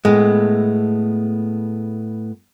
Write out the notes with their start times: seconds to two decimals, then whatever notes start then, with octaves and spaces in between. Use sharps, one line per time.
0.05 A2 G#3 A3 B3